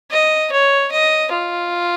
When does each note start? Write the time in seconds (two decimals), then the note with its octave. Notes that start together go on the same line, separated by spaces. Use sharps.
0.12 D#5
0.52 C#5
0.92 D#5
1.32 F4